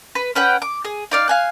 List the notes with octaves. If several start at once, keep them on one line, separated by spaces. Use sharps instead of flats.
B4
C#4 B4 F#5 G5
D6
G#4
D#4 D5 F5
F5 G#5 F#6